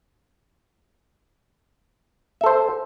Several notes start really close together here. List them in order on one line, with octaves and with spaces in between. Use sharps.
E5 A4 C5